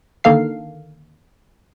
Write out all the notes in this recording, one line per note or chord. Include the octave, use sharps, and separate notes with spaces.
D3 D#3 A#3 A4 F5 C7